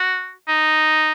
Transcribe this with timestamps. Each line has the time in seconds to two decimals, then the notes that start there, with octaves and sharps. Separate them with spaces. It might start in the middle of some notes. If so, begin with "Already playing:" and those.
Already playing: F#4
0.48 D#4